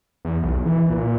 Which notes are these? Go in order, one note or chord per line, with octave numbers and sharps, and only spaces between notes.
E2
B1
E3
A#2